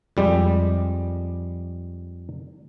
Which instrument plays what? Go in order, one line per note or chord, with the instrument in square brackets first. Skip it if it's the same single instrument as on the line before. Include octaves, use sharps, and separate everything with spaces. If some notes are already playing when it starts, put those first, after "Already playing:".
[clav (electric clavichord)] F2 G3 G#3 G4